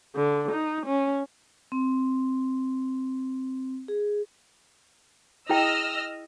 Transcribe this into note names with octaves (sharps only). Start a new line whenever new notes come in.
D3
D#4
C#4
C4
G#4
E4 G#4 D#5 G5 E6 F6